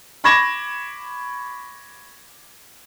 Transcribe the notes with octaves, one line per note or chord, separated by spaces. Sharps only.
B5 C#6 D6 G#6 A#6 E7